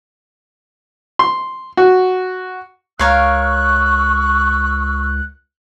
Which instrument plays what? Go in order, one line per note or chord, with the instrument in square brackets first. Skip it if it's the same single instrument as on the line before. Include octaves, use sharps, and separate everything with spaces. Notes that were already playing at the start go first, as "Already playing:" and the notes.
[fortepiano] C6
F#4
[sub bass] C#2 [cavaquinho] A#4 C#5 F5 [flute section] C#6 E6 [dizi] F#6